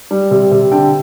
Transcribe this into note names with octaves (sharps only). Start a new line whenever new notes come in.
G3
C3
C3
D3 G5